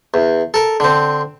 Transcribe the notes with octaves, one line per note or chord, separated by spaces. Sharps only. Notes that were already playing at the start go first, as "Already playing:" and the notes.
E2
A4 A#4
D3 C4